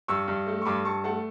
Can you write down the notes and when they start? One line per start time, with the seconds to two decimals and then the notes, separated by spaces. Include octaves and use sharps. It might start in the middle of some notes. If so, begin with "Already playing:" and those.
0.08 G2 C#6 E6
0.28 G2
0.47 A3
0.62 C#6
0.65 G2 B5 D6
0.85 G2 A5 C#6
1.04 A3 F#5 A5